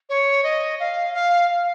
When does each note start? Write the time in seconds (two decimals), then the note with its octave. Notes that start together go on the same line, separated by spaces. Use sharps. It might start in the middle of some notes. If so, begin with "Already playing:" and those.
0.09 C#5
0.43 D#5
0.80 F5
1.14 F5